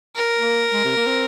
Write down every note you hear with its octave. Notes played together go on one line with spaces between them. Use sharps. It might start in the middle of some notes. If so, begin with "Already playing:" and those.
A#4
A#3
G#3
C3
A#3
C4